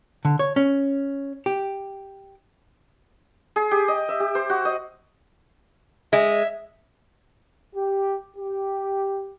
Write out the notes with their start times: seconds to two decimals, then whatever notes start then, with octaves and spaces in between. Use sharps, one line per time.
0.25 D3
0.39 C#5
0.56 C#4
1.46 G4
3.56 G#4
3.71 G4
3.88 D#5
4.09 E5
4.20 G4
4.35 C5
4.50 F#4
4.65 D#5
6.13 G#3 E5
7.76 G4
8.37 G4